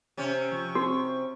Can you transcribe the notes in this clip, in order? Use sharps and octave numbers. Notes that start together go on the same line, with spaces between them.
C3 C#4
F3 C#6
C4 F#4